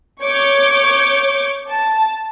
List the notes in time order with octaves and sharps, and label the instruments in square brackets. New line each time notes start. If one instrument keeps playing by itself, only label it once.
[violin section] C#5 C#6 D6 G6
A5